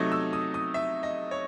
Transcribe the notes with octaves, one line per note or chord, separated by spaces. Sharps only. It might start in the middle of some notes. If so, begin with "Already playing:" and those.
Already playing: C3 F#3 A3 D#4 G#6
E6
D#6
D#6
E5
D#5
C#5